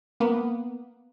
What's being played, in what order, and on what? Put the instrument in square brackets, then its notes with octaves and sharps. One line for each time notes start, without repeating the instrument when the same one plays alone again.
[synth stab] A#3 B3